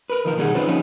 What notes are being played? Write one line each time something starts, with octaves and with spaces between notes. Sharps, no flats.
A#4 B4
D#3 F3 A#4
B1 D#3 G3 D#4 G#4 F#5
C#4 D#4 F4 B4 C5 D5
F3 G3 B3 C#4 D#4